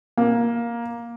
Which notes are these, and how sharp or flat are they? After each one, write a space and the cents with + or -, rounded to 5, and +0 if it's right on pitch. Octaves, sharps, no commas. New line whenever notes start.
A#3 +10